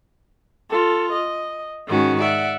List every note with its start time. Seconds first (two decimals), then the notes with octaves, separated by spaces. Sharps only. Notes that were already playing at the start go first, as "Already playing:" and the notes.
0.69 F4 A4
1.12 D#5
1.90 G#2 D#3 C#4 F#4
2.20 D5 E5 F#5